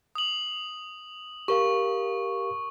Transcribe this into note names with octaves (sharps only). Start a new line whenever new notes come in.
D#6 F#7
G4 A#4 F5 C#6